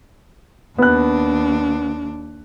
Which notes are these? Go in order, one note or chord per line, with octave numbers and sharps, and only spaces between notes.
D#2 B3 D4 F#6